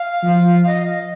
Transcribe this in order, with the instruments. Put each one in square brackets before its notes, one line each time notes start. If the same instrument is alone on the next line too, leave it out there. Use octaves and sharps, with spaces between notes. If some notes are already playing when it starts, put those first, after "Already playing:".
Already playing: [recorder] F5
[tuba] F3
[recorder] D#5